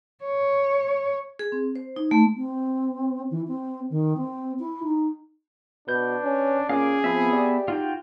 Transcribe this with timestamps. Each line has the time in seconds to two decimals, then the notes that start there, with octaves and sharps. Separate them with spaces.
0.24 C#5
1.39 G#4
1.52 C4
1.76 C5
1.96 D#4
2.11 A3
2.37 C4
3.31 E3
3.47 C4
3.90 D#3
4.17 C4
4.59 E4
4.83 D#4
5.88 B2 D4 B4 G6
6.24 C#4
6.69 A#2 C#4 G#4 F5 D6
7.04 F3 B3 C4 B4 E5
7.33 G4 D5
7.68 D#4 F4 F#4 G5